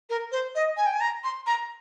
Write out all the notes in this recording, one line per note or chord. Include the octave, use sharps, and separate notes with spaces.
A#4
C5
D#5
G#5
G5
G#5
A#5
C6
A#5